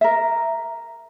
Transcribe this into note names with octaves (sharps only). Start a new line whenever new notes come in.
A#4 E5